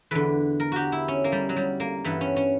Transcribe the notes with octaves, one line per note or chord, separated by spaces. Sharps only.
E2 D3 B4
A#4
F#4 G4
E4
C#4
A#3
G3
F#3
G3
A#3
G2 E3 B3
C#4
C#4